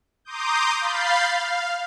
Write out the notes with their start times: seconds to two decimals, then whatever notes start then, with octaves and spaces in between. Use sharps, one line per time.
0.25 A#5 C6 D6 D#6 G6
0.80 F5 B5 G6 A6 C7
1.31 F5